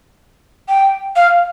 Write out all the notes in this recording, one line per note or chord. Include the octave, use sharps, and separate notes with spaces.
G5
F5